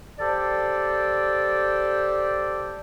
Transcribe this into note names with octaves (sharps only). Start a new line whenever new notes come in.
G4 A4 C5 D5